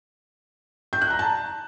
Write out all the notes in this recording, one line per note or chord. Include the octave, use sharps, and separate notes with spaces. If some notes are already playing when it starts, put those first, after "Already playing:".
G6
F#6
A#5
A5